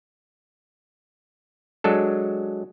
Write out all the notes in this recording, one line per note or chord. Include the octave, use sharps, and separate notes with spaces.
F#3 G#3 D4 A4